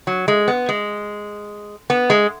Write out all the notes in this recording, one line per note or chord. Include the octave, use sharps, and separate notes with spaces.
F#3
G#3
B3
G#3
B3
G#3